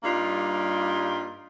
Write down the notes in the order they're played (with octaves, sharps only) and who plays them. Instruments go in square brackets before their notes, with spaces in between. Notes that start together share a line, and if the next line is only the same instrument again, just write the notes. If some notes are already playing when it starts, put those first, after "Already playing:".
[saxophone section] G2 G3 A#3 D#4 F4